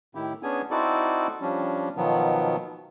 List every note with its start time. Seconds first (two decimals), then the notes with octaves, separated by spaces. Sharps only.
0.15 A2 D#3 E4 G4
0.43 B3 C#4 D4 G#4 G#5
0.71 C4 D#4 E4 F#4 A4 D5
1.42 F3 G3 C#4 D4
1.97 B2 D#3 F3 F#3 B3